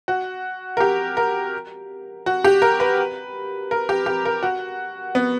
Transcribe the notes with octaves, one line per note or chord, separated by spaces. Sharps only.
F#4
A#4
G4
A#4
F#4
G4
A#4
B4
A#4
G4
G4
A#4
F#4
B3